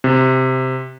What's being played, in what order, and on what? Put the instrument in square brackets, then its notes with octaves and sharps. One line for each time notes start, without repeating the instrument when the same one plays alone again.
[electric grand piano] C3